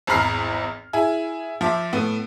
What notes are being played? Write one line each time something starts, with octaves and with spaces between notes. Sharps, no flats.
G#1 E2 A#5 B5 F6 C7
E4 G#4
F3 E5 D6
A2 B3